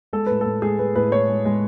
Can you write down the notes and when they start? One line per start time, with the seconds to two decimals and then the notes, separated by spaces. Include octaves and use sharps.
0.13 G#3 A4
0.26 A2 B4
0.41 A2 A4
0.62 G#3 G#4
0.79 G#3 B4
0.95 A2 B4
1.12 A2 C#5
1.29 G#3
1.45 G#3